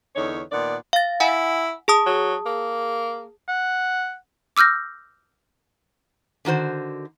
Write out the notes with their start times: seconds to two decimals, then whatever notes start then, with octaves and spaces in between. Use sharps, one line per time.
0.15 E2 D3 D#4 C#5
0.52 A#2 D#3 B3 D5
0.93 F5 A6
1.20 E4 F#5 G#5
1.88 G#4 A5 D#6
2.06 F#3
2.46 A#3
3.49 F#5
4.57 D6 E6 F6 G6 A#6
6.45 D3 D#3 F#4 C5